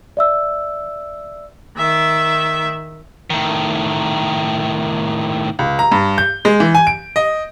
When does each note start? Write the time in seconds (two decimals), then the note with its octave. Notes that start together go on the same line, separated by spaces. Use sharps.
0.17 D5 E5 E6
1.77 D#3 E5
3.30 A2 D#3
5.59 C#2
5.79 A#5
5.92 G2
6.18 G6
6.45 G#3
6.60 E3
6.75 G#5
6.87 D7
7.16 D#5